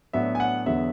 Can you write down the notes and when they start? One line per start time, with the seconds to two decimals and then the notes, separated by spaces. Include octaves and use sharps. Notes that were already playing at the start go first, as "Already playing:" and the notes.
0.13 A2 F#3 B3 D4 E5
0.35 G#5
0.40 F#5
0.66 E2 D3 F#3 B3 E5